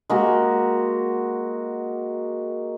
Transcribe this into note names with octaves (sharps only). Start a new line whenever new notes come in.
G#3 A#3 F#4 G4